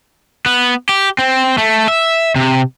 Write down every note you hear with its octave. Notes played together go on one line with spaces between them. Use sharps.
B3
G4
C4
A3
E5
C3